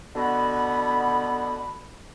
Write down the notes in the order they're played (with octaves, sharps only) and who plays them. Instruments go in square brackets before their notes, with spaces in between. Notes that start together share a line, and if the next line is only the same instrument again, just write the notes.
[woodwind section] B2 D3 B3 F#4 B5